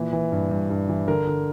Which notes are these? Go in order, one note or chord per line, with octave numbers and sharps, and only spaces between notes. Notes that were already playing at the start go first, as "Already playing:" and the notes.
Already playing: A#2 E3
E3
G2
G2
G2
E3
D3 A#4
D3